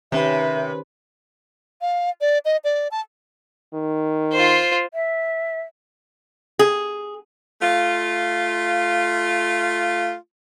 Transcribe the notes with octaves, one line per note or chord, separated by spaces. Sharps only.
C3 D#3 C#4 B4 E5
F5
D5
D#5
D5
A5
D#3
F4 C5
E5
G#4
A3 F4